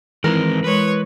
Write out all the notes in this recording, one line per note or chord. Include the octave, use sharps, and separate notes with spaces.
D#3 E3 G#3 C4 A#4
G#3 B4 C#5